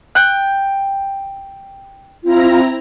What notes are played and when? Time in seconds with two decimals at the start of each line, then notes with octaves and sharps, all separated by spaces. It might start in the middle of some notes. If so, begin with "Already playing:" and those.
0.15 G5 F#6
2.24 C4 E4 F4 A#5